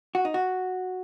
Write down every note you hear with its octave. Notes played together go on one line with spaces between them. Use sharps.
F#4
D#4
F#4